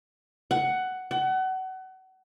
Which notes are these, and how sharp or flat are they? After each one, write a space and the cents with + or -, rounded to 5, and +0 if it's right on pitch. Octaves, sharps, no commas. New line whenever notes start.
F#5 +10
F#5 +30